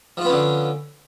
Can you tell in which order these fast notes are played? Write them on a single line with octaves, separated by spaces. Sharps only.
F3 F4 B3 C#4 D3